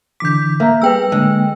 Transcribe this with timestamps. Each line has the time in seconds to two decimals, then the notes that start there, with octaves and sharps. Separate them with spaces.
0.20 D3 E3 D6 G6 B6
0.60 A#3 E5 A#5
0.82 G3 B3 G#4 B4 G5 E6
1.12 D3 G#3 A#3